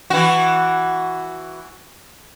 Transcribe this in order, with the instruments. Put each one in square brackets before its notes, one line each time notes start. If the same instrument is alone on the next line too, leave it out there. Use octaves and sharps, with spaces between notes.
[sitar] E3 F#4